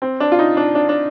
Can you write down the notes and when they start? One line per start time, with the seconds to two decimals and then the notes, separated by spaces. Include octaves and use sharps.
0.02 C4
0.20 D4
0.32 F4
0.39 D#4
0.57 D4
0.75 D4
0.89 D4